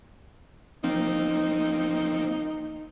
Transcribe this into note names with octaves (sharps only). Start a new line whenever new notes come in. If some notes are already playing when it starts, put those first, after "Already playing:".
F3 A#3 C4 D#4